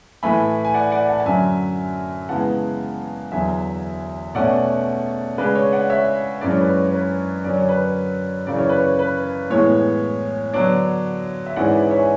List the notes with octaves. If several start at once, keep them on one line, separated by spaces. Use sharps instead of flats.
A2 E3 A3 G#5 B5
G#5
D5 F#5
D5 F#5
F#5 A5
A5
F#2 D3 F#3 E5 G#5
C#3 E3 G#3 B3 F#5 A5
E2 D3 F#3 E5 G#5
B2 A3 C#4 D5 F#5
C#3 G#3 D4 B4
C#5
D5 F#5
C#5 E5
F#2 E3 G#3 D4 D5
C#5
B4
C#5
C#5
B4
F#2 D3 F#3 C#4 D5
C#5
B4
C#5
F#2 C#3 E3 D5
C#5
B4
C#5
B4
A2 E3 G#3 B3 C#5
D3 F#3 B3 D4 C#5
E5
G#2 E3 G#3 C#4 E4 D5 F#5
B4 D5
D5
C#5 E5
G#5